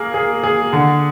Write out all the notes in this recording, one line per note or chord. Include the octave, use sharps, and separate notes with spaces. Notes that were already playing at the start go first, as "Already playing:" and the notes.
Already playing: A#3 G#4
G#4
G#4
D3